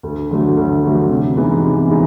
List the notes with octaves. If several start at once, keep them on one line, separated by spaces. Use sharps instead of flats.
D2
D3 F#3 A3
D2
D3 F#3 A3
C3
E3 G#3 B3 D#4
C3
E3 G#3 B3 D#4